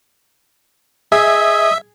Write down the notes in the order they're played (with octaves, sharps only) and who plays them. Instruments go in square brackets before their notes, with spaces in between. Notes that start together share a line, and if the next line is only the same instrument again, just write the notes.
[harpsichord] G#4 [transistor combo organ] D#5 [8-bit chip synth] E5